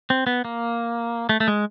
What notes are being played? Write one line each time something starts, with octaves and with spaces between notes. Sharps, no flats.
C4
B3
A#3
A3
A3
G#3